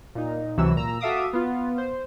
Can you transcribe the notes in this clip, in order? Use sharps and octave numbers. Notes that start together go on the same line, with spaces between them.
A#2 D#4
C#2 C3 E3 F#3 F#4 E6
A#2 A#5 E6
F#4 A4 E5 F5 D6 D#6
B3 F4
C5